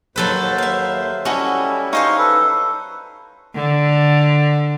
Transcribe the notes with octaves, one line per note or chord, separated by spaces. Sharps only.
D#2 F#3 A4 B4 C5
E5 F5
G3 C#4 E4 F#4 A4 D#5
D#4 C5 F5 C6 C#6
A4 B4
D3